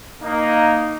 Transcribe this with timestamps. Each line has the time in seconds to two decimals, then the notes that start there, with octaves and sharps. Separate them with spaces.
0.22 A#3 D#4